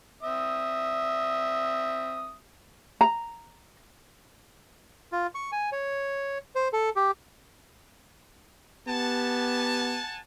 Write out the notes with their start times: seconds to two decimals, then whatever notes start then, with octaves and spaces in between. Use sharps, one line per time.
0.23 C4 E5 D#6
3.01 A#5
5.12 F4
5.35 C#6
5.52 G#5
5.72 C#5
6.55 C5
6.73 A4
6.96 G4
8.88 B3 G4 F#5 G#5 A5